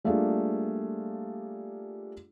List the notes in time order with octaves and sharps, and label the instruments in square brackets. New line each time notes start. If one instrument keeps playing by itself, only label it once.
[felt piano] G3 A3 A#3 D4 F4 G#4